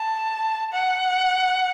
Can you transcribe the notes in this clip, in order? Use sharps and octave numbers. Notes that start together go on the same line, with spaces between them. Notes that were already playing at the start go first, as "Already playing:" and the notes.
Already playing: A5
F#5